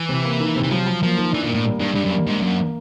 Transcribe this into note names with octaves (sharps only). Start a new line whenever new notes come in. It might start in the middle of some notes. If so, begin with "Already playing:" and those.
Already playing: E3
C3
A#3
D#3
C3
E3
F3 F#3
F#3
F3 A#3
D#3
E3 D4
A#2
A2 A#3
G3
G2 D4
G2 G3
F#2
A#3
G#2 D4
F#2 A#3